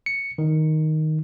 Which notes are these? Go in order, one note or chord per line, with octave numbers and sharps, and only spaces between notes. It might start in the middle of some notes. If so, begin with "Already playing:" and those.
C#7
D#3